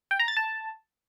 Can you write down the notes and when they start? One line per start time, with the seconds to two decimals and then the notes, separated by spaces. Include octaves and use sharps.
0.11 G5
0.19 A#5
0.28 A6
0.37 A5